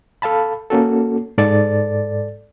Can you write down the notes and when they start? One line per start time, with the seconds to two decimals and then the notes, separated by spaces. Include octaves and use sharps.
0.22 A4 F5 A5 B5
0.70 A#3 C#4 F#4 A4
1.38 G#2 A4 D5 A6